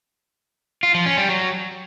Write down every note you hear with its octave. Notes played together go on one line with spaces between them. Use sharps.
F4
F3
C#4
G3
F#3